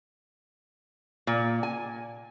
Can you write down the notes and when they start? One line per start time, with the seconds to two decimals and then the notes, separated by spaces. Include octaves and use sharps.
1.27 A#2
1.63 G#5